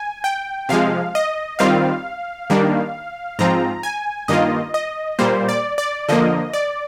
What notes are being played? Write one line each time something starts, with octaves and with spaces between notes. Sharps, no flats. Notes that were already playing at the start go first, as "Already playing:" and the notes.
Already playing: G#5
G5
C3 F3 G#3 F5
D#5
D#3 G3 C4 F4 F5
D#3 G3 A#3 D4
G#2 F3 C4 F4 A#5
G#5
G2 D#3 A#3 F4 D#5
D#5
A#2 G3 A#3 C5
D5
D5
D3 F3 A#3 D#5
D5